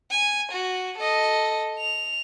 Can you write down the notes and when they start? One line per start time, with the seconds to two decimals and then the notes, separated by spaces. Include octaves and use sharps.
0.11 G#5
0.52 F#4
0.98 A4 D#5
1.79 F7